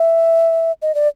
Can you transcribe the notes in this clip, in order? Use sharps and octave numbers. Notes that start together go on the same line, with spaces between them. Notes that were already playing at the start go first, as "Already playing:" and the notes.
Already playing: E5
D#5
D5